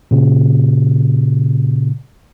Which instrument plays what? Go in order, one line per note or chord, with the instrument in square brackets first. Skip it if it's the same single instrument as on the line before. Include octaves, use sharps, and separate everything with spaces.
[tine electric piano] A#2 C#3